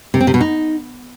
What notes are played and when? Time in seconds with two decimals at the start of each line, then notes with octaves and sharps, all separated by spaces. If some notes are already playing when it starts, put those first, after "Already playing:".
0.14 C3
0.21 C4
0.27 C3
0.34 B2
0.41 D#4